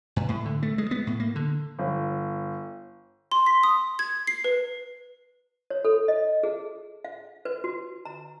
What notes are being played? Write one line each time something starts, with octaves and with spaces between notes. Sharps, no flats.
G2
A2
D3
A3
G#3
B3
A2
A#3
D3
G1
C6
B6
D#6
G#6
C7
B4
C#5
A4
D#5
G#4
F5
B4
F#4
A#5